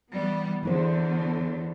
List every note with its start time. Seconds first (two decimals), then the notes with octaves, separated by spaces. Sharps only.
0.12 E3 G3 B3
0.63 E2 D3 E3 E4 C5